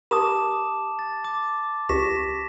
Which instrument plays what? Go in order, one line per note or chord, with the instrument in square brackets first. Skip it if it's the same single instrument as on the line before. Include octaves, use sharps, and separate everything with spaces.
[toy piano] G4 D#6 [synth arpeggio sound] A#4 [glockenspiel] A5 D6 E7
[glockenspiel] A6
D6
[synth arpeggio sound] C#2 [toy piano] G4 [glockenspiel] A#6 B6 E7